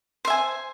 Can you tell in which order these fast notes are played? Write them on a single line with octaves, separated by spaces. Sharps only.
C5 E5 G#5